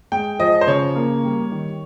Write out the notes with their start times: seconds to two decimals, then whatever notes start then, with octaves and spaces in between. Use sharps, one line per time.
0.12 G#3 G5
0.39 F3 D#5
0.61 C5
0.67 C#3 C#5
0.96 A#3
1.23 G3
1.52 D#3